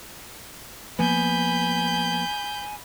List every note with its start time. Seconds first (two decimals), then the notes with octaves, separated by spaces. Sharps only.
0.99 F3 A#3 B3 G#5 B5 G6